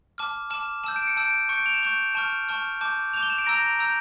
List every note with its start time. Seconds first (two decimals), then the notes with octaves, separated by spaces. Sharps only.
0.18 A5 D6 F6
0.50 A5 D6 F6 E7
0.84 A5 E6 G6 E7
0.96 D7
1.07 C#7
1.17 A5 E6 G6 D7
1.49 C#6 G6 C#7
1.58 D7
1.66 F7
1.74 E7
1.83 C#6 G6
2.15 A5 C#6 F6
2.49 A5 C#6 F6
2.81 A5 D6 G6
3.13 A5 D6 G6 F7
3.23 G7
3.30 E7
3.38 D7
3.46 A#5 E6 G6 A#6
3.79 A#5 E6 G6